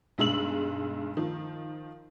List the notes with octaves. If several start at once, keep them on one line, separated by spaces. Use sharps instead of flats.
B1 G2 G#3 E6 F#7
D#3 F3